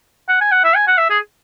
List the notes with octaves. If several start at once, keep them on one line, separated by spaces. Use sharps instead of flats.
F#5
G#5
F#5
E5
G#5
F#5
E5
G#4